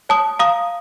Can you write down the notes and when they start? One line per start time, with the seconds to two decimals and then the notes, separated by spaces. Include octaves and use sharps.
0.09 C#5 A5 D#6
0.39 F5 A#5 D#6